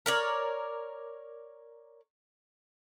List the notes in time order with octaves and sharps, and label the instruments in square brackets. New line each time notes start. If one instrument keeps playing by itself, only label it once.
[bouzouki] A#4 C#5 D5